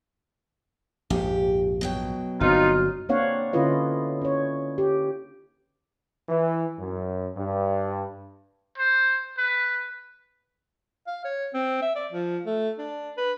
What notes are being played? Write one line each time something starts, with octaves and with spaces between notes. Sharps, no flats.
A#1 F2 G#2 G4
B2 F#3 G5
G1 C4 D#4 F4 F#4
A#3 C4 D4 C#5 F5 F#5
D3 C#4 E4 F4 B4 D#5
C#4 C#5
G4
E3
F#2
G2
C5
B4
F5
C#5
C4
E5
D5
F3
A3
D4
B4